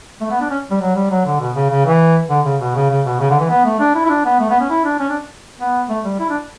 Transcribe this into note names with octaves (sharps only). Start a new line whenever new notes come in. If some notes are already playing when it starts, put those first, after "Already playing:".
A3
B3
D4
C#4
G3
F#3
G3
F#3
D3
B2
C#3
C#3
E3
D3
C#3
B2
C#3
C#3
B2
C#3
D3
E3
B3
A3
D4
E4
E4
D4
B3
A3
B3
C#4
E4
D4
C#4
D4
B3
A3
G3
E4
D4